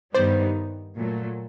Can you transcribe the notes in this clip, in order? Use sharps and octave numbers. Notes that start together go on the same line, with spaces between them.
G2 D#3 G3 B3 D#4 C5 D5
A#2 F#3 A3